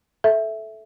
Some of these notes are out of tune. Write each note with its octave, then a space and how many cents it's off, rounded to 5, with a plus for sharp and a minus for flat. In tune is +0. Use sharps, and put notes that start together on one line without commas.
A4 -15 E5 +0